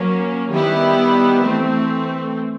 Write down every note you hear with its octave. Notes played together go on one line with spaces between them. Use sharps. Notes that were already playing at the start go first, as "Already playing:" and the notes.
Already playing: F#3 A#3 C#4
D#3 G3 B3 E4
E3 A3 C4